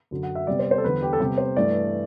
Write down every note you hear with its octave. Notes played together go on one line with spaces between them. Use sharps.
F#2 D3 F#3
F#5
E5
C3 G3 B3 D5
C5
C5
A4
E2 D3 G3 B3 B4
G4
A4
C3 G3 B3 G4
C5
G2 E3 A3 D5